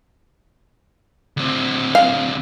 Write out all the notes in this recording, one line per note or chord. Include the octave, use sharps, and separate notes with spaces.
D2 C4
F5